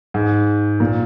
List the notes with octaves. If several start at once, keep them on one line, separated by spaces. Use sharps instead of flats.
G#2
A#2